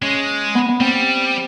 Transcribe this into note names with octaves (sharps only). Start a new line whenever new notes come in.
G#3 C#4
B3
B3
G3 C4